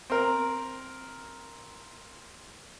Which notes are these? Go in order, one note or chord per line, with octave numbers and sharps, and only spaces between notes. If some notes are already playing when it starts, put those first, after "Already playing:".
C4 A#4